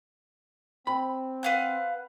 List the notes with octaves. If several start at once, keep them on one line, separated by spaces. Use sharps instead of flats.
C4 B5
B4 F5 F#5